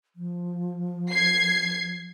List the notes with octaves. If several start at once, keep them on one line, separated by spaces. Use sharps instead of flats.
F3
G#6 C7